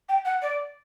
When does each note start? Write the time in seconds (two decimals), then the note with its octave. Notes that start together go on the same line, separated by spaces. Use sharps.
0.09 G5
0.25 F#5
0.42 D5